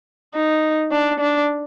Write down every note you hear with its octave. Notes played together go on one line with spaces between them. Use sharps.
D#4
D4
D4